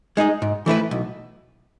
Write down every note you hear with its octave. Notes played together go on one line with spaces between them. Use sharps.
G#3 D#4 G#4 D#5
G#2
E3 A3 E4 B4
B1